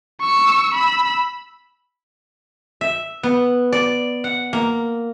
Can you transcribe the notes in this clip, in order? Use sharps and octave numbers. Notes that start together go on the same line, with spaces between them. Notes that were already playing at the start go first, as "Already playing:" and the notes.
C#6 E6
B5 E6
E5
B3
D5
F#5
A#3